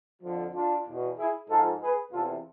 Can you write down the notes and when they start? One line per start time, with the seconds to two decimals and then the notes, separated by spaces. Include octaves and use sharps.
0.22 F2 D3 F3
0.54 D4 F4
0.86 E2 B2
1.17 E4 G#4
1.48 G#2 F3 F4 A4
1.81 G#4 B4
2.12 E2 C3 E3 F4 A4